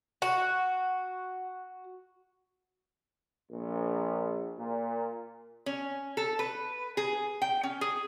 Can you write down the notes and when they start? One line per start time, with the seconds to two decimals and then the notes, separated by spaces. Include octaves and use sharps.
0.22 F#4 F#5
3.51 A#1
4.58 A#2
5.66 C#4
6.17 A4
6.39 B4
6.97 G#4
7.42 G5
7.63 C#4
7.81 G#4